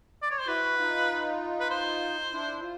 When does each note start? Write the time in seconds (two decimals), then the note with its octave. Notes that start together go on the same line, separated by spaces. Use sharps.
0.22 D5
0.31 C#5
0.39 C5
0.47 E4 F#4 B4
0.78 D#4 F4
1.60 B4
1.71 C5
2.32 D4 E4
2.62 F4